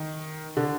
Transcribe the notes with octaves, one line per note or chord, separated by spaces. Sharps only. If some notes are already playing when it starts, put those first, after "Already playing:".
Already playing: D#3
D3